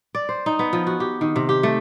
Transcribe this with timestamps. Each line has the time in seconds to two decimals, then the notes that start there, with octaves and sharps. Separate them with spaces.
0.15 D5
0.29 C5
0.46 D#4
0.59 B3
0.73 F3
0.87 F#4
1.00 G4
1.21 D#3
1.36 C3
1.49 G4
1.63 A3